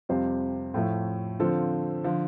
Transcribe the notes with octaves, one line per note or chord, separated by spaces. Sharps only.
F2 C3 G3 F4 C5
A2 F3 A3
D3 F3 C4 F4 A4
D3 F3